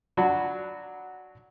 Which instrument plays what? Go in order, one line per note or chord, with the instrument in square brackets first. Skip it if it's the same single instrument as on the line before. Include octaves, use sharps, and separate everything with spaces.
[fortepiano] F#3 D4 F#4 A5 B5